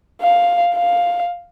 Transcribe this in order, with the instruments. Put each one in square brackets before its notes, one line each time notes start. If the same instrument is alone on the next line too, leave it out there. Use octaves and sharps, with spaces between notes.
[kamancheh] F5
F5